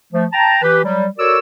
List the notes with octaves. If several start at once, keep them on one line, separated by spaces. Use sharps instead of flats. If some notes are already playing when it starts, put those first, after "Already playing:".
F3 A3
G5 A5 A#5
E3 G4 B4
F#3 G3
F#4 A4 A#4 C#5 D5 E6